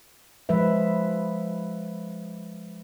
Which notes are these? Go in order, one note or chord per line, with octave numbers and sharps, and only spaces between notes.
F3 G#3 B4 E5